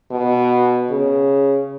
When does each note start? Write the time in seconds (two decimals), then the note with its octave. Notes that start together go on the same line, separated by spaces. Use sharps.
0.11 B2
0.90 C#3